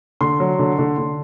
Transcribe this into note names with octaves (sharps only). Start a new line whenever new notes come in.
D3 C6
F#3
D3
D3
D3